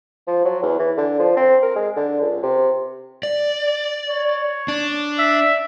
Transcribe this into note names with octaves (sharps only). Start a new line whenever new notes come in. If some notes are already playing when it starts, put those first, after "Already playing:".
F3
F#3
E2
E3
D3
F3
C4
A#4
G#3
D3
C#2
C3
D5
C#5
D4
E5